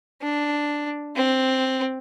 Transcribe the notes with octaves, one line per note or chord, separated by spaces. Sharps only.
D4
C4